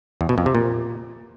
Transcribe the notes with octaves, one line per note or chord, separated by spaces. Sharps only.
E2
B2
F2
C3
A#2